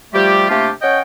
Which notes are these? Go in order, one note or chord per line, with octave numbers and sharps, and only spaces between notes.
F3 G3 A3 G4
C3 A3 A#3 D4 F4 G4
C#4 C#5 D#5 F#5 G5